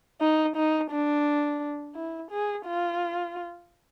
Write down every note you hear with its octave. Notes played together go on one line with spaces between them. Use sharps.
D#4
D#4
D4
E4
G#4
F4